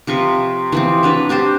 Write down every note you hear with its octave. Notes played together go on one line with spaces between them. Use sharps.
C3 F3 B4 C#6
E3 F3 C4
F#3 D4 B4
C4 D4 G4 C5